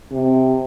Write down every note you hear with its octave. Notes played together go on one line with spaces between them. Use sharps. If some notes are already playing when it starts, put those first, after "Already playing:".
C3